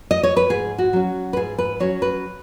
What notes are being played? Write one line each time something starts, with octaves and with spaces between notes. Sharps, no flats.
D#5
C#5
B4
G#2 G#4
F#4
F#3 C#4
B4
G#2 G#4
B4
F#3 C#4 C#5
B4